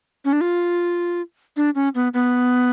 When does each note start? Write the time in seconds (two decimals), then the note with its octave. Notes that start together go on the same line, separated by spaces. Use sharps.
0.25 C#4
0.33 D4
0.41 F4
1.56 D4
1.75 C#4
1.95 B3
2.14 B3